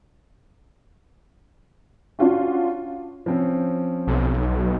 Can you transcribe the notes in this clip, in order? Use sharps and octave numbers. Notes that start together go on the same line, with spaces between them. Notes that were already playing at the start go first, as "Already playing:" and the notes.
C#4 D4 F4 F#4
F3 C4 C#4
B1